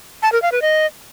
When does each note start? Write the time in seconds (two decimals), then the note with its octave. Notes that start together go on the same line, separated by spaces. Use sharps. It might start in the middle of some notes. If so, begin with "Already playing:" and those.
0.22 A5
0.32 A#4
0.42 F5
0.52 B4
0.62 D#5